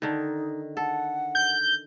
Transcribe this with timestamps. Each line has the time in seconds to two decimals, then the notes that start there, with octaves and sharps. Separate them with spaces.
0.02 D3 D#3 D#4
0.77 A4 F#5
1.35 G6